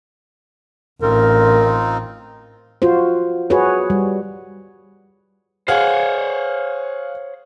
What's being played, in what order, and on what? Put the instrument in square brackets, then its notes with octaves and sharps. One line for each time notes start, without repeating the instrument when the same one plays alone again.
[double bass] A1 [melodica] C4 D#4 F4 [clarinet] A#4
[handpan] F4 F#4 C5
F#4 G#4 B4 C#5
G3
[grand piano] G#4 F5 F#5 [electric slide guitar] C5 C#5